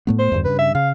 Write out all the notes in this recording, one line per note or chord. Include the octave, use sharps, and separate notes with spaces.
A2 A3 B3
C5
E2 G2 D#3
G2 C#3 B4
E5
C#3 F5